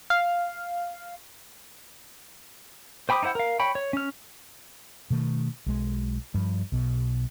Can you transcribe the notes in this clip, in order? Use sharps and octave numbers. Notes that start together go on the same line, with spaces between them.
F5
C5 G5 B5 D6 D#6
D#4 E4 C5 F#5 G5
A#4 F5
C#5 G5 B5
C#5
C#4 F6
B2 D#3 A3
B1 G#3
G2 F3
B1 B2